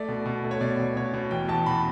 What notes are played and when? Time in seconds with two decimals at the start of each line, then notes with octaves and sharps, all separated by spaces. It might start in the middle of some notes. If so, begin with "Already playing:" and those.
Already playing: A3 D5
0.08 B2
0.26 B2
0.44 A3
0.51 C#5
0.61 B2 D5
0.79 B2
0.96 B2 C#5
1.14 B2
1.31 E2 G5
1.48 E2 A5
1.66 B2 B5